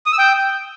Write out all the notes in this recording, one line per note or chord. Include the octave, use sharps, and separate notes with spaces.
D#6
E6
G5